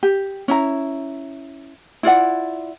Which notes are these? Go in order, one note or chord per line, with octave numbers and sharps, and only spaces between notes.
G4
C#4 E4 A#5
E4 F4 D5 F#5